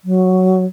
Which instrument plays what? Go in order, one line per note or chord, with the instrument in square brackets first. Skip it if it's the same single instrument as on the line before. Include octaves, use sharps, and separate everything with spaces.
[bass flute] F#3